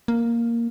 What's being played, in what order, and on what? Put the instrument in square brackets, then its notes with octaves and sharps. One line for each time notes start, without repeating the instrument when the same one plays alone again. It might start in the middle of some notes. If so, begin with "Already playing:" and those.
[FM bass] A#3